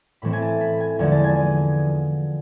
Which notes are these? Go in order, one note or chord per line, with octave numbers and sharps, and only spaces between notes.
A2 E3 A3 C4 B5
G#5
A5
B5
G#5
E2 D3 F3 G#3 G#5
A5
G#5